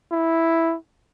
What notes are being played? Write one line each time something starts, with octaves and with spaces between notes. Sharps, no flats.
E4